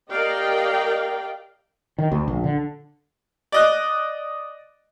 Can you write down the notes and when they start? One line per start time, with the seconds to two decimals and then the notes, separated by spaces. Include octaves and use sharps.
0.11 G4 A#4 D5 D#5 F5 G5
1.98 D#3
2.11 D2
2.28 A#1
2.44 D3
3.52 D5 D#5 F#6